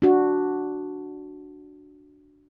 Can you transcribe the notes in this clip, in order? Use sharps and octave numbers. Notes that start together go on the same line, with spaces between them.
D4 F#4